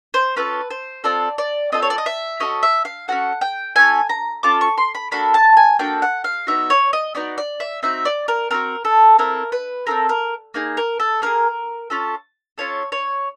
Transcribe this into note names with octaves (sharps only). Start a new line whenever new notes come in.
C5
C#4 F4 A4 B4
C5
C4 F4 A4 D5
D5
C4 F4 A4 D#5
C#5
D5
D#5
E5
C#4 F#4 A4 D#5
E5
F5
C#4 F#4 A4 F#5
G5
C#4 F4 A4 G#5
A#5
C#4 F4 A4 D6
C#6
C6
B5
A#3 D4 F#4 A4 B5
A5
G#5
A#3 D4 F#4 A4 G5
F#5
F5
B3 D#4 F#4 E5
C#5
D#5
B3 D#4 F#4 D5
D5
E5
C4 D#4 F#4 E5
D5
A#4
C4 D#4 F#4 A#4
A4
C4 E4 A4 A#4
B4
C4 E4 A4 A#4
A#4
A#3 D#4 G#4
A#4
A4
A#3 D#4 G#4 A#4
C#4 F4 A4
C#4 F4 A4 C#5
C#5